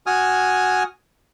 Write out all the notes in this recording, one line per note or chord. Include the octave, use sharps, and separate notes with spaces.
F#4 G#5 D#6 F6